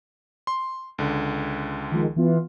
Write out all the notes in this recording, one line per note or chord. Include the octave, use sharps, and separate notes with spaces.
C6
C#2 D3
D#3 F3 G#3
E3 B3 F4